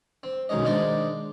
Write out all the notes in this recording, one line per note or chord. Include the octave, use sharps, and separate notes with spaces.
C4
B1 D#3 G#3 C#4 D#5
D#3 G#3 D4 C5 D5 D#5